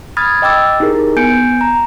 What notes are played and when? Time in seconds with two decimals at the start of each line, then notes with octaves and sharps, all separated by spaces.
0.17 B5 D#6 F6 G#6 A6
0.42 D#5 G5 D6 E6 A6
0.80 D#4 E4 G4 G#4 A#4
1.16 B3 G#5 G6 C#7 D7
1.61 A#5